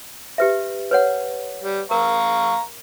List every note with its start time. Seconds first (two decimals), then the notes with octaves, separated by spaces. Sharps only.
0.38 G4 B4 E5
0.91 B4 C#5 F#5
1.62 G3
1.91 A#4 F5 A#5 C#6